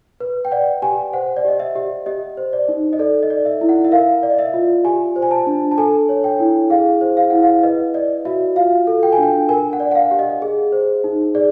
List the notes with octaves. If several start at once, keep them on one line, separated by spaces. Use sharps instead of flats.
B4
G5
D5 F#5
G4 G#5
C5 F#5
D5
G4 D#5
E5
G4
G4 D#5
C5
D5
D#4
D#5
A4 D5
D#5
D5
E5
E4
F#5
E5
A#4 F5
D5
D#5
E5
F4
G4 G#5
C5
G#5
A5
D4
A5
A4 G#5
C#5
G5
E4
G#4 F5
C5
F5
E4 F#5
F5
B4 D#5
D5 D#5
F#4 E5
F4 F5
A4
G5
G#5
D4 G5
A#4 G#5
F#5
D5
F#5
F5
G4
D#5
G#4
C5
D#4
G#4 D5